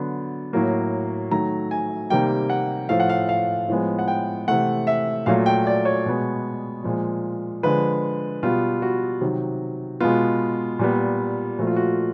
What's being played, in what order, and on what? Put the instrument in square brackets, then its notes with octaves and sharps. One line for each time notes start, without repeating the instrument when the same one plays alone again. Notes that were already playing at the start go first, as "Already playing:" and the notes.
Already playing: [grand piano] D3 F#3 B3
A2 F#3 A#3
D#3 F#3 A3 A#5
G#5
C3 D#3 G3 A#3 G5
F#5
A2 F3 A3 F5
F#5
F5
F5
A2 F3 G#3 B3
F#5
G5
C3 E3 A3 F#5
E5
A#2 F#3 A3 F5
G5
D5
C#5
B2 G#3 B3
A#2 F3 G#3
D3 F3 G#3 B4
B2 G3 B3 F4
F#4
C3 D#3 F#3
B2 G#3 B3 F4
A#2 G3 B3
A#2 F3 A3 F#4
F4
F#4